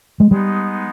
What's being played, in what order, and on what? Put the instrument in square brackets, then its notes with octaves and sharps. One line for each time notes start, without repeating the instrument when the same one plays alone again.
[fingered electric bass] G#3
[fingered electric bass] G3 [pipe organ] G#3 B3 D#4